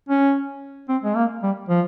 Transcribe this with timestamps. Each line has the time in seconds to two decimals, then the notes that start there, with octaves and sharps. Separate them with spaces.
0.09 C#4
0.88 C4
1.04 G#3
1.16 A#3
1.43 G3
1.69 F3